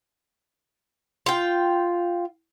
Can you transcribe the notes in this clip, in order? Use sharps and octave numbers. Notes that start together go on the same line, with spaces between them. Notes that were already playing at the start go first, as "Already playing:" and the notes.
F4 G5